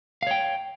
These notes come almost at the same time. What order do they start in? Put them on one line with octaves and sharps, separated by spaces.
F5 C#5 G5